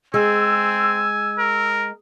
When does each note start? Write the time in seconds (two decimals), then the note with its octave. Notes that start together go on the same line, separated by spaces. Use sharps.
0.14 G#3 C4 G#5 E6
1.39 A#4